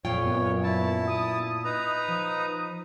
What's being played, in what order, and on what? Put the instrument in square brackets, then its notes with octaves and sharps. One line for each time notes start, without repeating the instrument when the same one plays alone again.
[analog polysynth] F2 [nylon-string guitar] A#2 F4 G5 [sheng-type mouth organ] C#5
[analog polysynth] F#2 B3
[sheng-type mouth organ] E4 A5
[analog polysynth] D#6
[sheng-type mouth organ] D#4 B4 A#5
[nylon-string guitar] F3